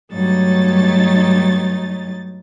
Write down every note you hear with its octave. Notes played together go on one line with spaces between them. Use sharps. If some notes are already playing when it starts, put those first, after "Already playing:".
G2 F#3 A3 D#4 C#5 A6